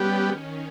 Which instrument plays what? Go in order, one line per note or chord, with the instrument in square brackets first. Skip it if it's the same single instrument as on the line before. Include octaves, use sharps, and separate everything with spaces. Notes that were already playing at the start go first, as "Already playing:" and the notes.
Already playing: [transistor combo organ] G3 B3 G4 [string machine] C#4
[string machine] D#3